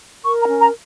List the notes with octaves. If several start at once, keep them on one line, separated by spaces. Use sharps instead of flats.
A#4 C#6
A#5
C#4
A#5